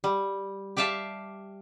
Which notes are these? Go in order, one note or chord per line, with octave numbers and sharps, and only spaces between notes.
G3
G4 D5 E5 F5 A5